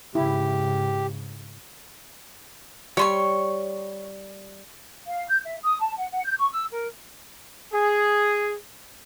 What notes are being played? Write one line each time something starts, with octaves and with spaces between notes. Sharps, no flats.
G#2 C#3 E4 G4
G3 C#5 C6 C#6
F5
G6
E5
D#6
A5
F#5
F#5
G6
C#6
E6
A#4
G#4